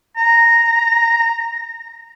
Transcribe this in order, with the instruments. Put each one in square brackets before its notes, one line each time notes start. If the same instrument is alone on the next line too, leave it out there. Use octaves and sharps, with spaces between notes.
[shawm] A#5